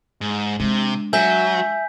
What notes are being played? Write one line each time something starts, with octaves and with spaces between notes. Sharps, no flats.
G#2
C3 G#3 D4
F#3 E5 G#5 G6 B6